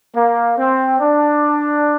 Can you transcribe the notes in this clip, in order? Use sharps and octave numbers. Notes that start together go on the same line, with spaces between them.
A#3
C4
D4